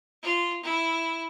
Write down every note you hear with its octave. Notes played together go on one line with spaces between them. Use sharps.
F4
E4